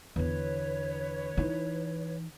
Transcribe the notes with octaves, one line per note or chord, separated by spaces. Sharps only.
E2 D3 B4 C#5
E3 D#4